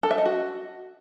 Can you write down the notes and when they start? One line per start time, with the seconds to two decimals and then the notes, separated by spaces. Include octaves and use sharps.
0.03 A4
0.11 E5
0.18 D#5
0.25 F#4